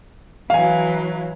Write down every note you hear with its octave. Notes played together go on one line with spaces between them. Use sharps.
E3 F#3 F5 G#5